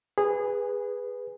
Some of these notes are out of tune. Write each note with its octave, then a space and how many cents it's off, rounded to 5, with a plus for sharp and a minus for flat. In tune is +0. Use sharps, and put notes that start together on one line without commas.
G#4 -20 B4 +0